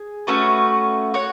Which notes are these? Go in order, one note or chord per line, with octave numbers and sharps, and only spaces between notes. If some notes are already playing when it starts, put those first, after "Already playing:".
Already playing: G#4
A3 C#4 F#4 B4
F#4 C#5 F#5